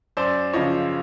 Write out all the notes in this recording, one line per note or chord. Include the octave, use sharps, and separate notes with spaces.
F#2 C5 D5
C#3 F3 C#5 D#5